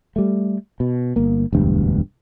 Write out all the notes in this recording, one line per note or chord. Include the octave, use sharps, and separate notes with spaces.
G3 A3
B2
G1 A#3
E1 D2 G2